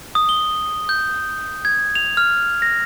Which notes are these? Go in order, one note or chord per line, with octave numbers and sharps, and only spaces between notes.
D#6
G7
G6
G#6
F7
F6
A#6